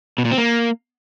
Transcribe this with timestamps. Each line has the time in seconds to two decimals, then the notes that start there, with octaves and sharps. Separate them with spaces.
0.18 B2
0.25 A#2
0.31 C4
0.38 A#3